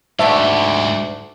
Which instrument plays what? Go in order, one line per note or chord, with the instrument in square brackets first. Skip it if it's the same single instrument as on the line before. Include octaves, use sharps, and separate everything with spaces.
[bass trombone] D2 [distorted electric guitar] G#2 G4 [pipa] D3 A3 D4 [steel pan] E5